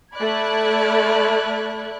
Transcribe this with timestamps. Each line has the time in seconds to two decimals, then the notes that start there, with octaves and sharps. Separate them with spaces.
0.14 A3 D5 B5 F#6 G#6